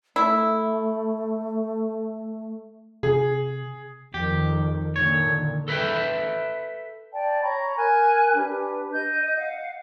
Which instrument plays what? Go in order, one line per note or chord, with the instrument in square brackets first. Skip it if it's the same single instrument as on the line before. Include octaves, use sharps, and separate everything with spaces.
[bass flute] A3 [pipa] E4
[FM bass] C3 [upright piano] G#4
[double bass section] F2 D#3 [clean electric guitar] G4
[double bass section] A#2 D3 D#3 [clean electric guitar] C#5
[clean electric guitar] A4 B4 D#5 E5 G5
[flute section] D5 G5 A5
C#5 A#5 B5 C#6
A#4 G#5 F#6 G#6
D4 G4 B4
D#5 G6
F5 F#5